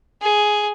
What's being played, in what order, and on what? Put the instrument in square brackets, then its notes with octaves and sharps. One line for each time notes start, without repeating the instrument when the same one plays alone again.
[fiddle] G#4